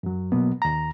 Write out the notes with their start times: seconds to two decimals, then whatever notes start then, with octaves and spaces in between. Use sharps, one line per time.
0.03 F#2 F#3
0.32 B2 F#3 A#3 B3
0.62 D#2 A#5